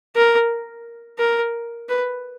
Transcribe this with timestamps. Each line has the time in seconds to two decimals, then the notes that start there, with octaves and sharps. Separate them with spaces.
0.16 A#4
1.19 A#4
1.89 B4